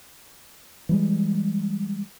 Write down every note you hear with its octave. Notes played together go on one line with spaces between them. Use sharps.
E3 G3 G#3